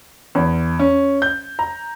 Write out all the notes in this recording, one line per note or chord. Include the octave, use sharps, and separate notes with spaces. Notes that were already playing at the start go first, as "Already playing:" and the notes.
E2
C#4
G6
A#5